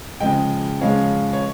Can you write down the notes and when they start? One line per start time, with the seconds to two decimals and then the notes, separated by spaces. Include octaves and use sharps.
0.20 C#3 F3 G#3 D#5 G5
0.81 C#3 F3 G#3 C#5 F5
1.33 C#5